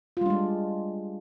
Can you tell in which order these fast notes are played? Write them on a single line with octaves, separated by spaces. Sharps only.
F4 G3 D4 G#3